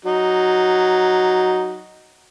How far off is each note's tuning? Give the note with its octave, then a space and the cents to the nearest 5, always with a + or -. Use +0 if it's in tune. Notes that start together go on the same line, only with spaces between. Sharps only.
F#3 +0 D#4 +0